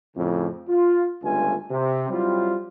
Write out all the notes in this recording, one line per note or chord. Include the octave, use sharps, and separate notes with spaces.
F2 A2 C#3
F4
G1 C#2 G2 A3 F4 G#5
C3
F#3 G3 C4 E4 F4